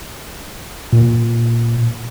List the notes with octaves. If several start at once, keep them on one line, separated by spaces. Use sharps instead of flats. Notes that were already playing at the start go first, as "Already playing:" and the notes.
A#2